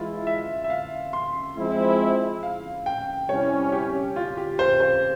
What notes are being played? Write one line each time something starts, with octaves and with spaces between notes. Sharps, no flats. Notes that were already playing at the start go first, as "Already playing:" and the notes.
Already playing: E3 G#3 E4 F4
E5
E5
F5
C6
F3 G#3 C4 E4
F5
G5
C3 G3 C#4 E4 C#5
G4
F4
G4
C5
C5